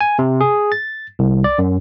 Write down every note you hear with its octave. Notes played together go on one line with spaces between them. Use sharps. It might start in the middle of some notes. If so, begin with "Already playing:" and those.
G#5
C3
G#4
A6
C2
D5
F#2